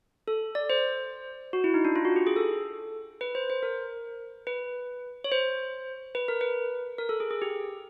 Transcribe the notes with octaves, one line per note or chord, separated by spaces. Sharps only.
A4
D5
C5
F#4
E4
D#4
D4
F4
F#4
G4
G#4
A4
B4
C5
C5
A#4
B4
C#5
C5
B4
A#4
B4
A#4
A4
G#4
G#4
G4